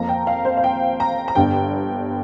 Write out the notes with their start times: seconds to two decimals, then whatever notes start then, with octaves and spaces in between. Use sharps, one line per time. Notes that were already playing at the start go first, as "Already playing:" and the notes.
Already playing: F2 F3 A#3 A#5
0.08 G5
0.27 F5
0.45 C5
0.57 F5
0.64 G5
1.00 A#5
1.28 A#5
1.35 G1 G2 D3 G5